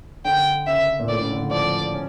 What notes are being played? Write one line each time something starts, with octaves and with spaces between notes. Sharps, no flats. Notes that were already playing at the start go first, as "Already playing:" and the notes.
D3 G5
C#3 E5
A#2
A2 D5
C#3
D3
F3 D5
C#4